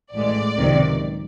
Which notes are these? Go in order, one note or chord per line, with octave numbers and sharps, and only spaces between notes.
A1 A2 E3 G#3 D5
C#2 C3 D#3 F#3